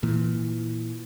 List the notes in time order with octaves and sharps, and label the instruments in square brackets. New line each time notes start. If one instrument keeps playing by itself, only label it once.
[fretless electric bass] A#2 E3